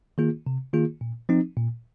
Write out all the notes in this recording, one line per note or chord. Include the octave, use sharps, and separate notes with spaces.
D#3 A#3 F4 G#4
C3
D#3 A#3 F4 G#4
A#2
F3 C4 D#4
A#2